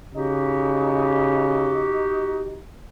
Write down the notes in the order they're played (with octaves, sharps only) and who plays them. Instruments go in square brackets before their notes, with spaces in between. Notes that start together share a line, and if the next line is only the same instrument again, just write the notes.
[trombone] C#3 [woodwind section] D#4 F#4 G4